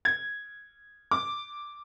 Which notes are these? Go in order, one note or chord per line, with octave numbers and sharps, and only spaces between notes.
G#6
D6